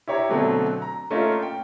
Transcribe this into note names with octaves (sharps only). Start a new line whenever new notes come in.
E4 G4 C#5 A#5
B2 D3 F#3 A3 C4
A#5
A3 A#3 C#4 D#4 F4 A#4
G5